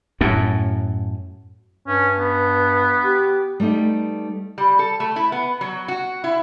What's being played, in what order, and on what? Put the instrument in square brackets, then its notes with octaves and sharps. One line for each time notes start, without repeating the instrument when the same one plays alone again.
[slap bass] F#2 A2
[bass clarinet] G2 [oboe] C#4
[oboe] B3
[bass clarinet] G4
[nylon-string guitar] G3 A3 B3 D#4
[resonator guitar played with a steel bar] G3
A4
A3
E4
B3
F#3
F#4
E4